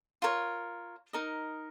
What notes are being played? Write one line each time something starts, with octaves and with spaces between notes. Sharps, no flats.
F4 A#4 C#5
D#4 A#4 D#5